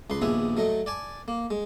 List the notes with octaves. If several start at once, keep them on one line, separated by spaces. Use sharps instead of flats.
C#2 B4 C6
A#1 D#2 B3 G#4 E5 D#6
F#3 A3 D#5
D5 G#5 A5
A#3
G#3